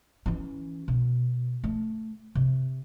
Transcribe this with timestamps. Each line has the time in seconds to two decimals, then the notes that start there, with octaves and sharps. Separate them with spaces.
0.26 E3 C#4
0.88 B2
1.64 A3
2.35 C3